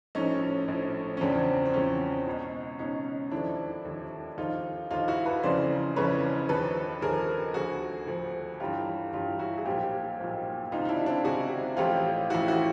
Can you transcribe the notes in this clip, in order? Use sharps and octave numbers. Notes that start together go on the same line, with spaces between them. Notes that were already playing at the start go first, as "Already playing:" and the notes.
A#1 A2 F3 C#4 D#4
A#1 A2 F3
C#4
E2 C#3 F3 C4 D4
C4
E2 C#3 F3 C#4
C#2 B2
C#2 B2 C#4 D#4
D#2 D3 F3 D4 E4
D#2 D3 F3
D#2 D3 F3 D#4 F4
D#2 D3 F3 D#4 F4
E4 F#4
A4 B4
F1 F2 C#3 E3 C5 D5
F1 F2 C#3 E3 B4 C#5
D#2 D3 F3 A4 B4
D#2 D3 F3 G#4 A#4
D2 D3 F3 F#4 G#4
D2 D3 F3
G1 G2 E3 F4 G4
G1 G2 E3 F4 G4
E4 F#4
G#4
B1 A#2 F3 F4 G4
B1 A#2 F3
C#2 C3 D#3 D#4 F4
D#4
D4 E4
C4 D4
C#2 C3 D#3 F#4 G#4
A1 A2 F3 F4 G4
A1 A2 F3 E4 F#4
E4 F#4